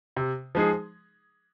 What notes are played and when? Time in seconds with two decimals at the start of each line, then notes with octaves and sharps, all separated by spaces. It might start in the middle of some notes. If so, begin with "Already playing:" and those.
0.17 C3
0.55 F3 G#3 D#4 G#4